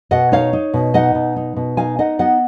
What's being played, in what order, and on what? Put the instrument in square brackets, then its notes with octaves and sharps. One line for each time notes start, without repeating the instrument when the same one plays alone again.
[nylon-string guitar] B2 D#5 F#5
D#4 C#5 F5
D#4
B2
D#4 D#5 F#5
B2
D#4
B2
D#4 F5 G#5
D#4 D#5 F#5
B3 D#5 F#5